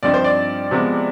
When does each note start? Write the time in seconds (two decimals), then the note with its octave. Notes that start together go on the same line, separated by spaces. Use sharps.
0.03 G2 F3 C4 D#4 D5
0.14 C5
0.24 D5
0.71 C3 F3 G#3 B3